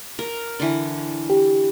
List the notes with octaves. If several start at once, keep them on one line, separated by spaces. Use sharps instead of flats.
A#4
D3 E3
G4